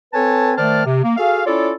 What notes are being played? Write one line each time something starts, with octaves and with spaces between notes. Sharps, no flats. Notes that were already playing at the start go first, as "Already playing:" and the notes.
C4 A4 B4 C#5 G#5 A5
D#3 A3 C5 D5 A5 F6
C3
A#3
F#4 G#4 A4 F5
C#4 E4 F4 A4 C#5 D5